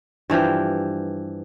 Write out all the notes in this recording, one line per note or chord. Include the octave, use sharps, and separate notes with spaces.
G2 E3 F3 G4